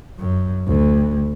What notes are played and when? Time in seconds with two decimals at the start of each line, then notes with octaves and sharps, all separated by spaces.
0.19 F#2
0.66 D2